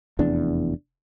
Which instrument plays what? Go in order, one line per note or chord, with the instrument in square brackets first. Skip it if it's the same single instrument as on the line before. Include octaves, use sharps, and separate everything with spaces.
[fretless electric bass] F1 E2 D4